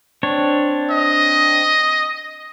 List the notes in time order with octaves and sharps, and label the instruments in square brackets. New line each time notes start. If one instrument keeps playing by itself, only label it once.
[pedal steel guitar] C4 D4 C#5
[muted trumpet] D#5